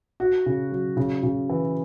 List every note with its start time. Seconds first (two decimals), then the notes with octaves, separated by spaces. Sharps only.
0.20 F#4
0.46 C#3
0.71 F#3
0.97 C#3
1.23 C#3
1.49 E3